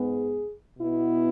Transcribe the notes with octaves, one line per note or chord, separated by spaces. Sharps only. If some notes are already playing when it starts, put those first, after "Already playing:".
Already playing: G#2 G#3 B3 G#4
B2 B3 E4